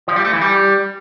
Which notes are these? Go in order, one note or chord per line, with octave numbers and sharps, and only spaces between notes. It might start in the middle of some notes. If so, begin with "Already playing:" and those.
F3
G3
A3
E3
G3